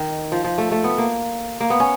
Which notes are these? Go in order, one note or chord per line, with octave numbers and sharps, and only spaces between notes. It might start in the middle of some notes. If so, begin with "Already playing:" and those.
Already playing: D#3
F3
F3
A3
A3
B3
A#3
A#3
B3
C#4